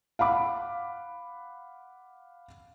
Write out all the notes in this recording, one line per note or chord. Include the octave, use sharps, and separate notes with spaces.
F5 F#5 B5 D6